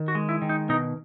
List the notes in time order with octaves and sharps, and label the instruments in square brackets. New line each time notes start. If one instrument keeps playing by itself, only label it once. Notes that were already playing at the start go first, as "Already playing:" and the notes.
Already playing: [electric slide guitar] D#3
F#4
G#3
E4
D#3
D#4
B2 D#4